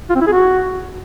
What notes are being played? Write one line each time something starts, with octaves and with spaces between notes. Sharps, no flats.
F4
C4
E4
G#4
F#4